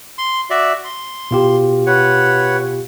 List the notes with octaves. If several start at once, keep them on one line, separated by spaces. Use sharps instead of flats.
C6
F#4 D5 E5
C6
B2 F4 G4
B4 C#5 F#5